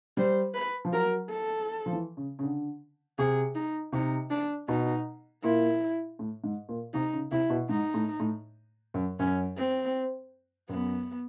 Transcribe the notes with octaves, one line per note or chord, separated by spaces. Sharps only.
G3 C5
B4
F3
F#3 A#4
A4
F3
E3
C#3
C#3
D3
C3 G#4
D#4
C3 D#4
D4
B2 D#4
A#2 E4
A2
G#2
A#2
C3 D#4
C#3
C3 E4
B2
G#2 D#4
A2
A2
F#2
F#2 C#4
C4
F#2 B3